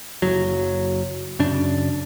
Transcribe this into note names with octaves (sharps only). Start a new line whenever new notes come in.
F#1 F#3
F#2 C#3 D4